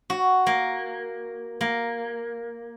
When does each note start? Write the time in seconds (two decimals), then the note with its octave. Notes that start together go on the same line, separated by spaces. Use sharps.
0.10 F#4
0.46 A#3
1.61 A#3